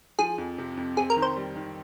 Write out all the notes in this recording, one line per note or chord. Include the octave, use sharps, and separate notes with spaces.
F3 G#4
F2
C3
F2
C4 G#4
A#4
D#3
C5
G3
D#3